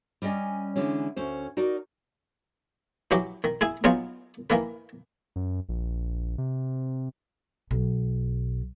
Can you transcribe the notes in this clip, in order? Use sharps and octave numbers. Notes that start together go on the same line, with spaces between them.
G3 C#4 D5 D#5 G#5
D3 E3 G#3 C#4
D2 C#4 C5
D#4 F#4 A#4 D5
E3 F#3 F#4 G4
D#3
E4 G#4 G#5
F#3 B3 D#4 F4 G#4
D#3 E3 A#3 B4
F#2
A#1
C3
B1